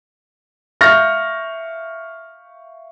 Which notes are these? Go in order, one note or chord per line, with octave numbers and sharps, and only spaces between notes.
E5 F5 C#6 F6 G6 A#6